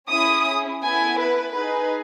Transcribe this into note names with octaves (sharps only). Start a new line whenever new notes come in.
C#4 E4 G#4 D#6
B3 E4 A4 G#5
B4
D#4 G#4 B4